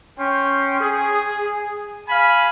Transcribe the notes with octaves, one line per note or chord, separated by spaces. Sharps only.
C#4 G5 C6
G#4
F5 G#5 B5